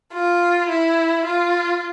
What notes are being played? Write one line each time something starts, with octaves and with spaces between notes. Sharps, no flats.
F4
E4
F4